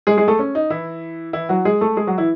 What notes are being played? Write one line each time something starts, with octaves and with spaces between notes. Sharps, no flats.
G#3 G#4
G#3 G#4
A3 A4
C#4
D#4
E3 E4
E3 E4
F#3 F#4
G#3 G#4
A3 A4
G#3 G#4
F#3 F#4
E3 E4